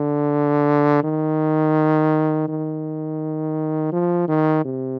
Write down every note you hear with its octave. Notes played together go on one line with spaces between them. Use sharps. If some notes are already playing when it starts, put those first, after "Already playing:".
Already playing: D3
D#3
D#3
F3
D#3
C3